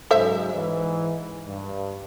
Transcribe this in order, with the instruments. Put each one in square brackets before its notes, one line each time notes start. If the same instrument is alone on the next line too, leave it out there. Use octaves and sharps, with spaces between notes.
[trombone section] G#2 C#3 F#3 [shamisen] A4 C5 E5
[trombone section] G#2 E3
G2